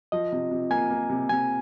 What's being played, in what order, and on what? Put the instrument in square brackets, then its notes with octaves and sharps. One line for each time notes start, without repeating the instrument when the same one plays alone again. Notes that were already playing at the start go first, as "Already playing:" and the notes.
[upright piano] F3 [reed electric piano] D#5
[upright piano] C3
C3
[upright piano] A#3 [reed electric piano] G#5
[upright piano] A#3
C3
[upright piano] C3 [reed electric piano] G#5